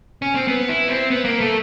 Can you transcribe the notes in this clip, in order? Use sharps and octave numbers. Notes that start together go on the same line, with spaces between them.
C#4
C4
B3
E4
C4
B3
A#3
A3